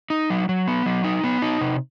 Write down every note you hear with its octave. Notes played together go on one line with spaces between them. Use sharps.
D#4
F#3
F#3
B3
F#3
D#4
B3
D#4
C3